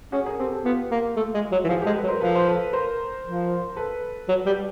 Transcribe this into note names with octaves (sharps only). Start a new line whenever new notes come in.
C#4 F#4 G#4
G#4 A#4
C4 G4 A4
G4 A4
B3 F4 G4
A#3
A3
G#3
F#3
E3
F3 F#4 G#4
G#3 G4 A4
A4 B4
F#3
A#4 C5
F3 A4 B4
C5
A4 B4
A#4 C5
F3
A4 B4
F#3
G3